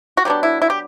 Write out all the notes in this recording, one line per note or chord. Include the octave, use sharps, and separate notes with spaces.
F#4
F#3 B3 D4 G4
E4
E4
G4